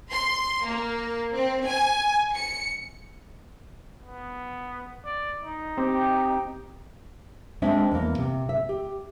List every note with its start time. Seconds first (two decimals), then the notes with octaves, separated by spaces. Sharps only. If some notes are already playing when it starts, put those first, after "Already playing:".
0.10 C6
0.66 A#3
1.34 C4
1.67 G#5
2.34 C#7
4.03 B3
5.05 D5
5.43 D#4
5.78 C4 G4
7.62 G#3 C4 D4 C5 E5
7.92 E2 A#3
8.18 C3
8.49 E5
8.69 G4